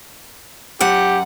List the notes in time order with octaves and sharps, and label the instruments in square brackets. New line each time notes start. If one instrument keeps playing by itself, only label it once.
[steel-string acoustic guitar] F#2 F#5 [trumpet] G4